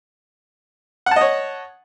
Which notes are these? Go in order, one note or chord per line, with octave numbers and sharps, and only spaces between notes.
C#5 D#5 F#5 A5